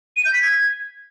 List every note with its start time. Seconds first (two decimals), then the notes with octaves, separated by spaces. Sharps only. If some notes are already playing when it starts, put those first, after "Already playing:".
0.17 D#7
0.25 G6
0.33 B6
0.42 G#6